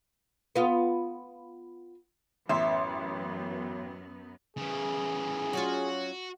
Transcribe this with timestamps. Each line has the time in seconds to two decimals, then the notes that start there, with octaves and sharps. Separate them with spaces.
0.56 B3 F4
2.49 A1 F#2 B3 E5 C6
4.57 C#3 E3 G#4
5.53 F#3 C#4 F4 F#4